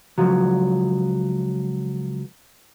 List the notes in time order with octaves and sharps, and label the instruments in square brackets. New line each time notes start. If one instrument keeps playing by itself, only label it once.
[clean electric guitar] C#2 F3 F#3